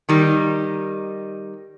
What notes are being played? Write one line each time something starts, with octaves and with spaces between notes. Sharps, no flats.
D#3 G3 D#4